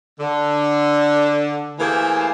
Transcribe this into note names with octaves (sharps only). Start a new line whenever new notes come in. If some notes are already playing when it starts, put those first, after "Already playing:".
D3
E3 A3 A#3 G4 G#4 C5